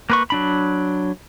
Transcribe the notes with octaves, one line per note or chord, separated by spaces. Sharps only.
A#3 B4 C#6
F#3 D4 B5